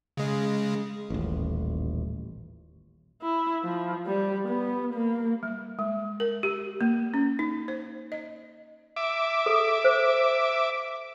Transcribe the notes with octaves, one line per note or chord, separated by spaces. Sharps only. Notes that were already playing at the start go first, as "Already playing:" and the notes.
C#3 G#3
D#1 A1
E4
F3
G3
B3
A#3
G3
G#3
A#4
G4
A#3
C#4
D#4
C5
D#5
E5 D6
A4
C5